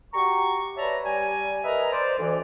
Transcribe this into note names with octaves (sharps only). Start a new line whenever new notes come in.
F#4 G4 A#5 C#6
B4 C#5 D5 E5 A5 A#5
G3 G#5
A#4 B4 D#5 E5 A#5
C5 D5
D2 E3